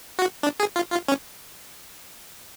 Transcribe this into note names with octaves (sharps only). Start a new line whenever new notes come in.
F#4
D4
G#4
F4
F4
C#4